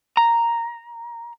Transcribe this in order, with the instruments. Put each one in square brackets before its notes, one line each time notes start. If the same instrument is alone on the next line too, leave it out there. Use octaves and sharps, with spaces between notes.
[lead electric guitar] A#5